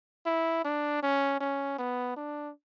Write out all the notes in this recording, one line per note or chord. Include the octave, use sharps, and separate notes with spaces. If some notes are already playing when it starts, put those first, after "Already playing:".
E4
D4
C#4
C#4
B3
D4